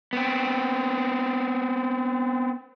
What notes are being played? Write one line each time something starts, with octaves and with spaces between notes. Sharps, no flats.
B3 C4